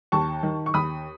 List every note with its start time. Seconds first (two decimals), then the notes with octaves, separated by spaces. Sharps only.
0.12 D#2 A5 C#6
0.43 D#3
0.66 C#6
0.74 D#2 B5 D#6